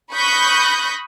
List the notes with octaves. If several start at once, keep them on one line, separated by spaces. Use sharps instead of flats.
B5 C#6 D#6 F#6 G6 A#6